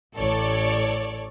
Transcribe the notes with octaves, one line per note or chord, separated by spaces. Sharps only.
A1 A4 C#5 D5